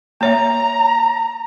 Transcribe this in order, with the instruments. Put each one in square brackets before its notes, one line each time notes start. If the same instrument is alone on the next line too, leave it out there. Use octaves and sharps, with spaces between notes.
[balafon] A#3 C#5 E5 [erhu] A#5